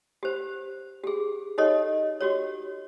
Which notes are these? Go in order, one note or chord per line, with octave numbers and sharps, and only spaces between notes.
G4 C5
G4 G#4
D#4 G4 A4 C#5 D#5
F#4 G4 C#5